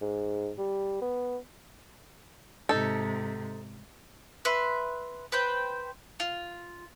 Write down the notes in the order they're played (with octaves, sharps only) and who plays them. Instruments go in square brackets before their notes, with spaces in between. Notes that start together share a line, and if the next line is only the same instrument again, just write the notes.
[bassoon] G#2
G3
B3
[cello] G#2 C3 [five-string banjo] D#4 A4
[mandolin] B4 E5 C6
B4 C5 G5
F4